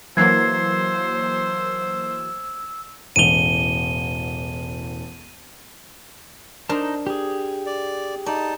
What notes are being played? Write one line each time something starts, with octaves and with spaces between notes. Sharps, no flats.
E3 F#3 A#3 C5 E6 G#6 C7
E1 A1 D#7 F7 G7
D4 D#4 A#4 C5 A5
G4 G#4
D5
D#4 D5 A5